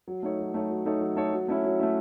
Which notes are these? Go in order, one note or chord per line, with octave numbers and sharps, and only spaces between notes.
F#3
A3 D#4 A4 C#5
F#3
A3 D#4 A4 C#5
F#3
A3 D#4 A4 C#5
F#3
A3 D#4 A4 C#5
F#3
A3 C#4 E4
F#3
A3 C#4 E4